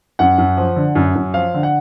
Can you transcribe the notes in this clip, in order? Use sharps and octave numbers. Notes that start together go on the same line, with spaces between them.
F#2 F#5
F#2
F3
D3
F#2
F#2
F3 F5
D3
F#5